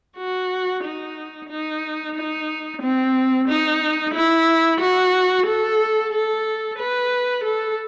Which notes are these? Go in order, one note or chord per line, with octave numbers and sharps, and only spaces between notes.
F#4
D#4
D#4
D#4
C4
D#4
E4
F#4
A4
A4
B4
A4